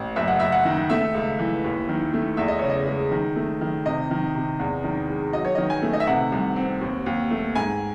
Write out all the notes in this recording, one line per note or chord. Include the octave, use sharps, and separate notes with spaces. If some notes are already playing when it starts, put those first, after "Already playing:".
Already playing: A1
F#1 E5
F#5
F#1 E5
F#5
D#3
A3 E5
C#2
E3
D#2
D#3
A3
E2 E5
D#5
C#3 C#5
D#5
G#3
D#3
A3
D#3
C3 D#5
D#3
C3
E2
D#3
G#3
F#3 D#5
C#5
D#3 D#5
G#5
A3
D#5
E5
C3 F#5
C2
C4
D#2
D#2
A3
G#2 G#5